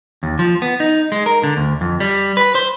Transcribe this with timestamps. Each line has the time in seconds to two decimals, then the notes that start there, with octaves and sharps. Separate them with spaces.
0.23 D#2
0.39 F3
0.62 B3
0.80 D#4
1.12 G#3
1.26 A#4
1.43 D3
1.57 D2
1.81 F2
2.00 G3
2.37 B4
2.55 C5